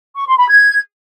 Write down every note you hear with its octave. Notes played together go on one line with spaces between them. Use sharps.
C#6
C6
B5
G#6